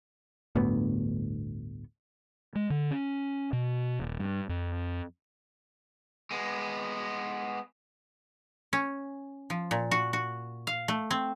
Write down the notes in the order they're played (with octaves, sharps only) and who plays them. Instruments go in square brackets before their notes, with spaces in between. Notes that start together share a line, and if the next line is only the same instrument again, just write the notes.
[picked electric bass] G1 D2 A2 B3
[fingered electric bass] G#3
D3
C#4
B2
D#1
G2
F2
[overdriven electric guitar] G#3 B3
[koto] C#4
F3
A#2
F#4
F#4
F5
A3
C4